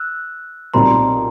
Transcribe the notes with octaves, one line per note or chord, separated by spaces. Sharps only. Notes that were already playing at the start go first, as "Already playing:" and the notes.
Already playing: E6 F#6
B1 A#2 G3 C4 A#5 C6